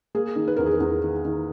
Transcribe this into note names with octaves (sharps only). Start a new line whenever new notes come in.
A#3 G#4
D#3
B4
E2 A#4
G#4
A#4
E2
D#3
D#3